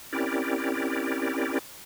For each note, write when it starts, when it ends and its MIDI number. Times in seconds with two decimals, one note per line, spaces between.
0.13 1.59 60
0.13 1.59 61
0.13 1.59 64
0.13 1.59 67
0.13 1.59 70
0.13 1.59 74